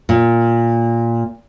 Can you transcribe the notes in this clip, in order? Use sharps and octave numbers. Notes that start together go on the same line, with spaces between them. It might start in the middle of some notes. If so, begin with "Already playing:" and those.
A#2